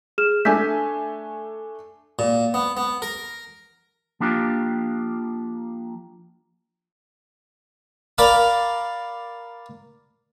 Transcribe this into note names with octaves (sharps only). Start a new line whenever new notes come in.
G#4 F6 E7
A3 D4 G#5 E6 G6 B6
A#2
B3
B3
A#4
F3 A#3 D4 F4 G4
A#4 D5 F5 A#5 B5